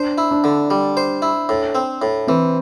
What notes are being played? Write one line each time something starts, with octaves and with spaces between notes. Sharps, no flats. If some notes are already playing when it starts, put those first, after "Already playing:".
Already playing: D4 C5
E4
D4
D3
G3
C5
E4
A2
C4
A2
E3 C4